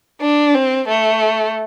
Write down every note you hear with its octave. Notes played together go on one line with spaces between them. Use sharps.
D4
C4
A3